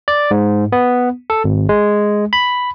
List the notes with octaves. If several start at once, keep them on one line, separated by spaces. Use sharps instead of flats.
D5
G#2
B3
A4
G#1
G#3
B5